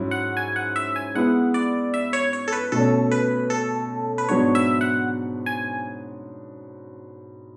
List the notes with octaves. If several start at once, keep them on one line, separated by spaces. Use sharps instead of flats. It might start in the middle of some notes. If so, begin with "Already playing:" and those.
Already playing: G#2 F#3 C#4 E4
F#5
G#5
F#5
E5
G#5
G#3 B3 E4 F#5
D5
E5
C#5
C#5
A4
B4
B2 A3 C#4 A4
B4
A4
B4
G#2 F#3 B3 D4 C#5
E5
F#5
G#5